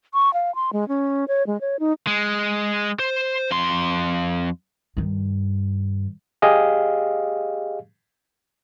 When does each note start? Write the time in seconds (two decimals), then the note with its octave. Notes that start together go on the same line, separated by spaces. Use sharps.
0.14 C#6
0.34 F5
0.55 C6
0.73 G#3
0.88 C#4
1.28 C#5
1.47 G#3
1.61 C#5
1.80 D#4
2.07 G#3
2.99 C5
3.51 F2 C6
4.97 G2 D#3
6.42 G4 G#4 D#5 F5